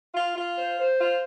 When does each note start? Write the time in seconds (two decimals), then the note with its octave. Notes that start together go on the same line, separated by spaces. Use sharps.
0.14 F4
0.35 F4
0.56 C5
0.78 C5
0.98 F4